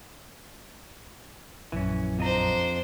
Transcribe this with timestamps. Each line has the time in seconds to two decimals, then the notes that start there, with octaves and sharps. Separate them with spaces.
1.72 A#1 F#2 E3 C#4
2.19 F2 D4 C5 D#5 A#5